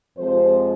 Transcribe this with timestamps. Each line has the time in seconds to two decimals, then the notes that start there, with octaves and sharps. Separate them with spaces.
0.17 F2 C3 F3 G#3 C5